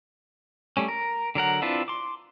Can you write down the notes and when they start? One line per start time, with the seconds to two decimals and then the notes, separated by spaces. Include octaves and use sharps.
0.77 G3 A3 C#4
0.88 A#4
1.35 D3 F#3 A#4 F#5
1.62 C4 D4 E4 F4 B4
1.88 C6 D6